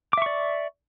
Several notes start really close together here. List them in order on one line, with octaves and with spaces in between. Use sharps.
D6 E5 C#6 D5